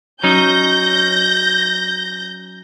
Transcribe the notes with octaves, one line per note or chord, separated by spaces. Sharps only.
F#3 C#4 D#4 G6 A#6